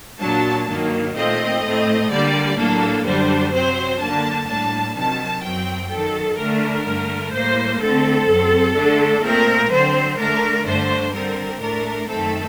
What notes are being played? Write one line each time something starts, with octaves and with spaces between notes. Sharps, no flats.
A#2 F#3 A#3 D4 A5
G2 D#3 F#3 A#3
A#2 A3 C4 D#5
A2 A3 C4
D3 G3 A#3 D5
A2 F#3 A#3 D4 A4
F#2 D3 G3 D4 C5
C3 F#3 C4 C5
D3 F#3 A#3 D4 A5
A2 G3 A#3 D4 A5
C3 D#3 F#3 A5
F#2 F#3 C4 G5
F#2 D#3 F#3 A4
D3 A3 D4 A#4
G2 D3 A3
A2 G3 A#3 C5
D3 A3 C4 A4
F#2 F#3 C4
D3 A3 D4
A#2 A3 C4 A#4
D3 F#3 C4 C5
D3 A3 D4 A#4
G2 D3 A3 D4 C5
D3 G3 C4 A#4
A2 A3 D4 A#4
F#2 D#3 A3 C4 A4